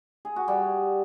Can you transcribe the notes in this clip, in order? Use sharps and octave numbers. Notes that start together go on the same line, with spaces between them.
G#4
F#4
G3